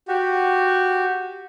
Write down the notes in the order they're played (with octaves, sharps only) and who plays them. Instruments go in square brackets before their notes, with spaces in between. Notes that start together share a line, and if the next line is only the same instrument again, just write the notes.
[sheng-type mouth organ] F#4 G4